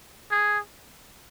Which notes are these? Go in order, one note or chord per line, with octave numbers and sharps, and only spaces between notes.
G#4